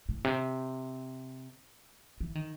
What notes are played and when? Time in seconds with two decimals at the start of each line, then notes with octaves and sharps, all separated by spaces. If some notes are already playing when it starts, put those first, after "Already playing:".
0.09 A2
0.24 C3
2.20 E3
2.35 D#3